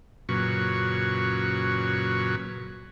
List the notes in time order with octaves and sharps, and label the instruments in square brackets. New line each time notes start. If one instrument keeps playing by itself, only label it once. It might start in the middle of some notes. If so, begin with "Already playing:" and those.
[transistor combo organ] F#2 A#2 C#3 F#3 B4 C#6